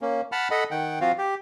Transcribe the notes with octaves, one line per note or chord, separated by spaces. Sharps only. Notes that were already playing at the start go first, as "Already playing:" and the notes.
A#3 C#4
F#5 A5 B5 F6
A4 D#5 F#5 B5
D#3 F#5 G5
F3 C4 F4 F#4 F5
G4